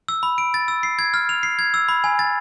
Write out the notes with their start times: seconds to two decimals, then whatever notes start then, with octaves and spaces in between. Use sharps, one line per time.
0.08 E6
0.23 B5
0.38 D7
0.54 A6
0.68 E6
0.83 C7
0.99 G#6
1.14 F6
1.29 F7
1.43 C7
1.59 G#6
1.74 E6
1.89 B5
2.04 G#5
2.19 A6